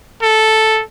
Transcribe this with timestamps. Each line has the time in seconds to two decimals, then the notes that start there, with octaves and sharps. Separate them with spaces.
0.22 A4